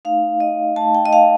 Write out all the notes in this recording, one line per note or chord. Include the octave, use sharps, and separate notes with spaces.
A3 D#4 F5
D#5
A3 D#4 A5
G5
D#5
F5